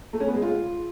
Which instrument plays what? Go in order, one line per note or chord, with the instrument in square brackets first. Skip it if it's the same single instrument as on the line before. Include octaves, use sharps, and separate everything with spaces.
[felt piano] A3
C#4
B3
G#3
F4